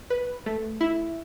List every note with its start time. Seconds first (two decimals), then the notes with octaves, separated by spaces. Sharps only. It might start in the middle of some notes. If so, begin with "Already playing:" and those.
0.10 B4
0.46 A3
0.81 E4